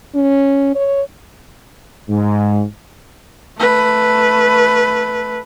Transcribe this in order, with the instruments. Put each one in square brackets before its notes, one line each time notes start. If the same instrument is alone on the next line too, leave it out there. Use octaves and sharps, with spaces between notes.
[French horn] C#4
C#5
[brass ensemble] G#2
[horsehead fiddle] A3 B4